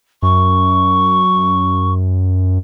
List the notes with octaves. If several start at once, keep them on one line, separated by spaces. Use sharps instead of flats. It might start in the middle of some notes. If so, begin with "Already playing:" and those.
F#2 C#6